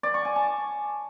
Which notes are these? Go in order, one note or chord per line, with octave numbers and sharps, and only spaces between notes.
D5
C#6
G#5
A5